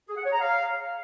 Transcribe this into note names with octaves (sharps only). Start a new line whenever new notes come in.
G#4
F#5
C#5
A#5
F5